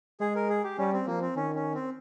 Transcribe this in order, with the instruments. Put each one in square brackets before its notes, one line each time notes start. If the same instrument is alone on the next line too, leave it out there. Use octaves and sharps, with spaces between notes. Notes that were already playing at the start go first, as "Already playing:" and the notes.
[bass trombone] G#3 [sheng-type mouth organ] G#4
[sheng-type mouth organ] A#4
G#4
G4
[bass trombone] G3 [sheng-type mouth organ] C#4
[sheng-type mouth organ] C4
[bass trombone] F3 [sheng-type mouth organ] A#3
[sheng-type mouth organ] C4
[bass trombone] D#3 [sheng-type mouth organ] C#4
[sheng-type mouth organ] C#4
C4